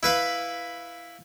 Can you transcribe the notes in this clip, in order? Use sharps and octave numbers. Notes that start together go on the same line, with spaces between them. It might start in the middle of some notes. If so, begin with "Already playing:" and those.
E4 B4 F5